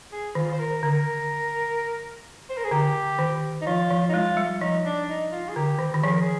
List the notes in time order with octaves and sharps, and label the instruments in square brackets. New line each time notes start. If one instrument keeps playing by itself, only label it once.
[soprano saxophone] G#4
[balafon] D#3 [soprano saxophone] F4
[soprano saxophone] C5
A#4
[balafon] D3 [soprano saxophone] A#4
[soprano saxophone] C5
A#4
G#4
[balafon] D3 [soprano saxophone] G4
[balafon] D#3
[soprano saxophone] D#4
[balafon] F3 [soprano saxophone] F4
[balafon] F3
[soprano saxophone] D#4
[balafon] G#3 [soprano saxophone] F4
[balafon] G3
[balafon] F3 [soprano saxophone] D#4
[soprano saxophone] D4
D#4
F4
G#4
[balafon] D3 [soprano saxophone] G4
[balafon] D#3
D#3
[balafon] F3 [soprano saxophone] G#4
[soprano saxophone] A#4
G#4